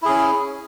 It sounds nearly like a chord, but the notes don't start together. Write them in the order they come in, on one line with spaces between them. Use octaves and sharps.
E4 G#4 C#4